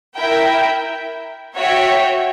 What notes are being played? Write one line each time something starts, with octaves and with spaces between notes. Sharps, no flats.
E4 A#4 E5 G5
F#4 C#5 E5 G5